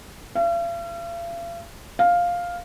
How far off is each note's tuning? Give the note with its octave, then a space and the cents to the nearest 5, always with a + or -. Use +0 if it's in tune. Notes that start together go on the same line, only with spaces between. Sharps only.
F5 -45
F5 +5